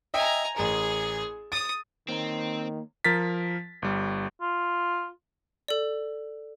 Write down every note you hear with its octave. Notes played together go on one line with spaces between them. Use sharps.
D#5 E5 G5 G#5 A#5
A1 G#4 A#4
D#6 A6
D#3 A#3 C4 C#5 A#5
F3 A#4 A6 B6
G1 G3
F4
A4 D5